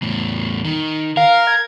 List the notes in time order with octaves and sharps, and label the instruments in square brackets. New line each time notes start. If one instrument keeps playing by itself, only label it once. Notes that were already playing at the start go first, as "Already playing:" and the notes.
[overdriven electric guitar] E2 A2
D#3
[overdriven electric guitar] A#4 [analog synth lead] F5
[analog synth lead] G#6